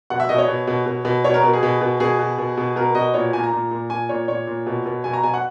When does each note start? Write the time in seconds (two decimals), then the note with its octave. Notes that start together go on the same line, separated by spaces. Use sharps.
0.10 B2 F#5
0.20 E5
0.29 B2 D#5
0.38 C#5
0.48 B2
0.67 B2
0.86 B2
1.05 B2
1.24 B2 C#5
1.34 A#4
1.44 B2
1.53 G#4
1.63 B2
1.81 B2
2.00 B2 G#4
2.19 B2
2.38 B2
2.57 B2
2.76 B2 A#4
2.95 B2 D#5
3.14 A#2 C#5
3.33 A#2 G#5
3.44 A#5
3.53 A#2
3.71 A#2
3.90 A#2 G#5
4.09 A#2 C#5
4.28 A#2 C#5
4.47 A#2
4.67 B2
4.86 B2
5.04 B2 G#5
5.14 A#5
5.23 B2 G#5
5.34 F#5